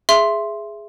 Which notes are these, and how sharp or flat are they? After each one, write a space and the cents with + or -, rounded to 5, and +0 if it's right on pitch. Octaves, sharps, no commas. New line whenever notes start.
G#4 +0 E5 +15 C6 +0